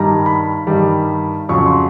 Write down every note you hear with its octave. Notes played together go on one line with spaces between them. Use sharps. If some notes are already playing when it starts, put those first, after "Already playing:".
Already playing: G2 D#3 G3 A#5
B5
G2 D#3 G3
F2 C#3 F#3 C#6
C6